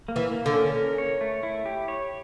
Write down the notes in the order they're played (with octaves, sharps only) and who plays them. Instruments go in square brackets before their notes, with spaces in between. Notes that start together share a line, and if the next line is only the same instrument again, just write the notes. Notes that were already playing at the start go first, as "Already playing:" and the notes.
[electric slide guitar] A#3
[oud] E3
[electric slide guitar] A#3
[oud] D3
[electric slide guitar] C#4
A#4
C#5
A3
E4
G4
C#5